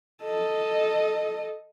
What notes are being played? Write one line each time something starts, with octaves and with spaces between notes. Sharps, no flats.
A4 D#5